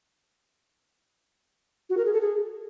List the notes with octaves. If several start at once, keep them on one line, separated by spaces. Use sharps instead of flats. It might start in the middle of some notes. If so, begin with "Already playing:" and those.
F#4
A#4
G#4
A4
G#4